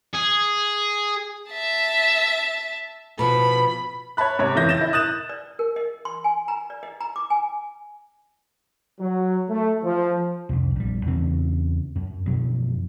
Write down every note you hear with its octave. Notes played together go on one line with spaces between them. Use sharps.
G#4
E5 A5
B2 F3 B5
C#5 E5 A5 B5 F#6
G#2 C3 C#5
F2 C#3 E3 E5 G6 A#6
G6 A6 E7
E4
D#6 F#6 A6 E7
D5
A#4
D#5
C6
G#5
A#5
D5
D#5
A#5
D6
G#5
F#3
A3
F3
C2 F2
A#1 G3
E2 C#3 C4
F#2
F#2 B2 F3 F#3